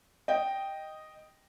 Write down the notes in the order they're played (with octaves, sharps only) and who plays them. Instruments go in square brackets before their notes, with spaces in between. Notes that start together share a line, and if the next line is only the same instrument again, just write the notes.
[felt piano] D#5 G5